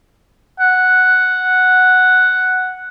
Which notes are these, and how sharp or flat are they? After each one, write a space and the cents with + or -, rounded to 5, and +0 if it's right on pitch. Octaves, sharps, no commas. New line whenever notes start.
F#5 +0